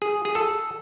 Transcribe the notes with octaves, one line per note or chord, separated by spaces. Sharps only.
G#4
G#4
A4